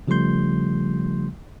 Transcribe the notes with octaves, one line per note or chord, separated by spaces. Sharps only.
C#3 F3 G3 A3 C6 G6